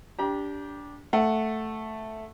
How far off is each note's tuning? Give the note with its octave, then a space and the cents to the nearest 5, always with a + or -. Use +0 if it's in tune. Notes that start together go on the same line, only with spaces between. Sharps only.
D4 -20 G4 +0 A#5 +40
A3 +0 F#5 +0